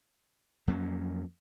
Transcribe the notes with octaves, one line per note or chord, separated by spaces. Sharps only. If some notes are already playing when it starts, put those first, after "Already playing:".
F2 F#3 A#3 C#4